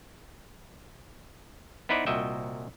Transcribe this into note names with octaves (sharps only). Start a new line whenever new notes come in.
B3 D#4 E4 B4 C5 D5
C2 A#2 F#4 D#5 E5 G5